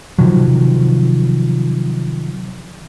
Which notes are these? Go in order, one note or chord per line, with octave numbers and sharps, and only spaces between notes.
C3 D#3 F3 F#3